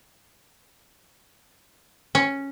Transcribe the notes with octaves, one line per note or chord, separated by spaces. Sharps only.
C#4